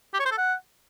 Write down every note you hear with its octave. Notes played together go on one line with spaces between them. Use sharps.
G4
C#5
C5
A4
F#5